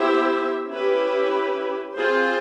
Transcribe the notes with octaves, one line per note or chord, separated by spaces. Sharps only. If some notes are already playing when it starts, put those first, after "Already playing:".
Already playing: B3 E4 G4 C5 E5
C#4 E4 G4 B4
C4 F4 G#4 C5